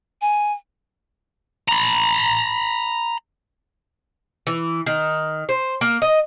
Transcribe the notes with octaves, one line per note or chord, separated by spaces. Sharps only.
G#5
A#5 B5
E3
D#3
C5
A#3
D#5